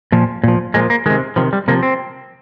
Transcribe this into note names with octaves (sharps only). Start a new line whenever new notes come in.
A#2 F3
A#2 F3
A#2 F3 G#3
A#3
C3 D#3 G#3
C3 D#3 F3
G3
C3 F3 A#3
C4